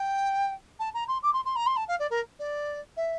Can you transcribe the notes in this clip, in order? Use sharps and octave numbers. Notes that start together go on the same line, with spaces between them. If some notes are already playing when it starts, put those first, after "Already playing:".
Already playing: G5
A5
A#5
C6
D6
C6
C6
A#5
C6
A5
F5
D5
A#4
D5
E5